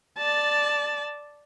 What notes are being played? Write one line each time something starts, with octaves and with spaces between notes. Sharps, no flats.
D5 A5